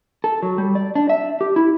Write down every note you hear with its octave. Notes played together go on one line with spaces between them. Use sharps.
A4
F#3
G3
D5
D4
E5
G4
E4